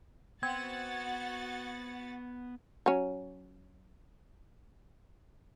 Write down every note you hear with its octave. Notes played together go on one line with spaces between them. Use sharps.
B3 C4 F#4 F#5 G#6 A6
F#3 C#4